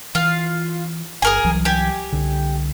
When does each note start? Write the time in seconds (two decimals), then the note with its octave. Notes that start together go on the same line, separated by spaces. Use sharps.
0.15 E3 F4 F5
1.22 G1 G#4 A#4 G#5
1.44 C2 E3 F#3
1.65 G4 G#5
2.12 C2 D3